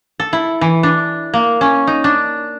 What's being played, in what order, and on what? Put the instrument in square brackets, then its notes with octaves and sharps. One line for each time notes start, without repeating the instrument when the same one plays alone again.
[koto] A4
E4
E3
D4
A#3
C#4
D#4
D4